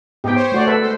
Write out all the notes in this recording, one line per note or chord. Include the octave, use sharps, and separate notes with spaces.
G#2 B3 D#4 G4 G5
C5 C#5
A3 F#4 D5
A4 B4 E5
G#3 C5